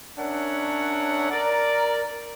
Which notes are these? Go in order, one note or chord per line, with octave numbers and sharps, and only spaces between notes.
C#4 D4 A#4 C#5 E5 F#5
A#4 D5